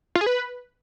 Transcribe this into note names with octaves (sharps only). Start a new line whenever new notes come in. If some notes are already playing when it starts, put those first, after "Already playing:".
F4
G#4
B4